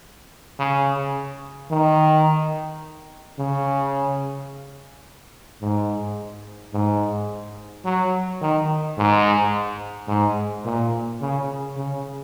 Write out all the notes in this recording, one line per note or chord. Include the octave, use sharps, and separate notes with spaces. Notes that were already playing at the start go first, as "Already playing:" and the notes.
C#3
D#3
C#3
G#2
G#2
F#3
D#3
G#2
G#2
A#2
C#3
C#3